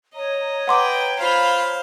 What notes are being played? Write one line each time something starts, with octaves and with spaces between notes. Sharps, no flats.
C#5 D#5 A#5
B4 F#5 G5 C6 D6
F4 C5 F5 B5